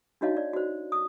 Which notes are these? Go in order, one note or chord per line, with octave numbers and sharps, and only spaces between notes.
D4 D#4 F#4 C#5 D#5 F5
D5
F#4 C5
D#6